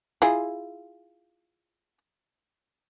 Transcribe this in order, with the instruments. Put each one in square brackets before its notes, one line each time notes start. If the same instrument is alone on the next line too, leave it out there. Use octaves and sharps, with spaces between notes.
[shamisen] E4 F4 G#4